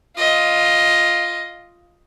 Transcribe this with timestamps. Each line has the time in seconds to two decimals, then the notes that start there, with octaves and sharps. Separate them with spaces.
0.16 F4 D#5